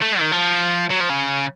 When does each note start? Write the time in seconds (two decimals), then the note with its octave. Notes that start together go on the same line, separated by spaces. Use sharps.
0.02 A3
0.20 D#3
0.32 F3
0.91 F#3
1.00 F3
1.10 C#3